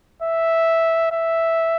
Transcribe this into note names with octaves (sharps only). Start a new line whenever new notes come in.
E5
E5